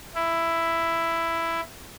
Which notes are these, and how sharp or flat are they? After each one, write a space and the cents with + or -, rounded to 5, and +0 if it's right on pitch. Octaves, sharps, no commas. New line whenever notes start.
E4 +10